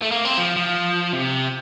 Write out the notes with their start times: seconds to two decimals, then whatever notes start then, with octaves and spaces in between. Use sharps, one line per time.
0.02 A3
0.11 A#3
0.25 C4
0.38 F3
0.56 F3
1.13 C3